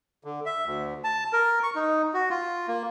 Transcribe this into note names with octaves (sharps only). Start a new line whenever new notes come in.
D3
E5
D2
A5
A#4
C#6
D#4
F#4
F4
A#3